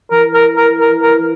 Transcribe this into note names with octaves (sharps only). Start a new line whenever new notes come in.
E3 A#4
A#4
A#4
A#4
A#4